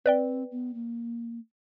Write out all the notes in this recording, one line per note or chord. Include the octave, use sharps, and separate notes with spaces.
C4 B4 D5 G5
B3
A#3